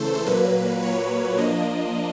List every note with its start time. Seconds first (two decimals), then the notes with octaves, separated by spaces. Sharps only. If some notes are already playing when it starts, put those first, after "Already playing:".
Already playing: C#3 E3 A3 A4 C5
0.26 A#2 F#3 A#3 B4
0.82 C#5
1.38 F3 A#3 D4 D#5